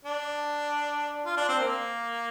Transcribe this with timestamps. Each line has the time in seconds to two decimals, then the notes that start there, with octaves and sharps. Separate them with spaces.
0.05 D4
1.26 F4
1.37 D4
1.49 C4
1.59 A#3